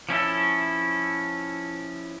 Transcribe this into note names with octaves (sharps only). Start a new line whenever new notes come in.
F3 C#4 E4 A4